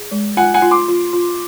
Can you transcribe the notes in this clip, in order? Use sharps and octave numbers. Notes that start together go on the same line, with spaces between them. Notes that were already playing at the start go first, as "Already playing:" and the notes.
Already playing: G#4
G#3
F4 F#5 G#5
F#5 G#5
F4
C6 D6
F4
F4